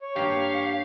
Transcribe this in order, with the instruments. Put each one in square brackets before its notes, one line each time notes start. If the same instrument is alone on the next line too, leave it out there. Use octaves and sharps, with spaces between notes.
[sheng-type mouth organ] C#5
[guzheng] G2 A#3 [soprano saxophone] G4 [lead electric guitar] F5